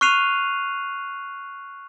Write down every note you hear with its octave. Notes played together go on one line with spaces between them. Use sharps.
C#6 F6 F#6 C7 D#7 F7